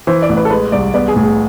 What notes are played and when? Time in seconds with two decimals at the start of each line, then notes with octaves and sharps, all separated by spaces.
0.07 E3 C5
0.22 D5
0.29 A1
0.37 B4
0.45 A4
0.50 G#3 B4
0.72 C2 D5
0.94 B3 D5
1.08 G#4
1.16 A2
1.23 G#4